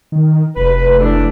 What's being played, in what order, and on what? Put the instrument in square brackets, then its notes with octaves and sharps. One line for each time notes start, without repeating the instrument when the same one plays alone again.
[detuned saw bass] D#3
[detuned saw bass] F1 [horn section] B4
[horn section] E3 A3 D4